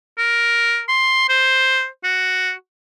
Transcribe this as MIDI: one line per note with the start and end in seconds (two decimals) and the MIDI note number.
0.18 0.82 70
0.88 1.25 84
1.29 1.87 72
2.04 2.52 66